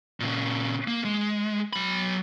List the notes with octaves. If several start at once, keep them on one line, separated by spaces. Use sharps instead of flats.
A#2 C#3
A#3
G#3
F#3 B5